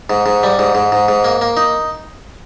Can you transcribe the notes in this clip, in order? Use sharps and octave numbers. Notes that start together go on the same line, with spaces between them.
G#2
G#2
G3
G#2
G#2
G#2
G#2
A#3
A#3
D#4